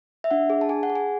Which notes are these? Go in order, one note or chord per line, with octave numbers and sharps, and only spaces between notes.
E5
D4 F#5
G#4
A5
G#4 G#5
F#5
G#4
G#5